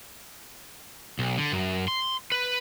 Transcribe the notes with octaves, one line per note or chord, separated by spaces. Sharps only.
B1
D3
F#2
C6
B4